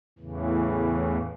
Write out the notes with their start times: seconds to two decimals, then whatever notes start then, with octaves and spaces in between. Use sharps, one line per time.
0.19 E2 A2 C#3 E3